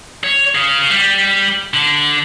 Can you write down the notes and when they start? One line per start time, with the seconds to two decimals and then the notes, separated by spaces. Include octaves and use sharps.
0.24 C#5
0.55 G#4 F5
0.90 G3
1.74 D3